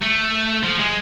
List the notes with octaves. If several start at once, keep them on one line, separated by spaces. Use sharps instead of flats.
A3
F3
G#3